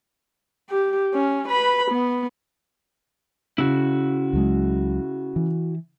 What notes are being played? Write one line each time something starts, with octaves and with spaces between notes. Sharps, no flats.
G4
C#4
B4 B5
B3
C#3 E4 F#4
C#2 F#3 G#3
E3